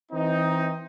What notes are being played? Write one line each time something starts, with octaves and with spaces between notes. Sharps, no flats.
E3 C4 D#4